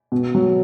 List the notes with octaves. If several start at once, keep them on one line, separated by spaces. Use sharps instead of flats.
B2
F#3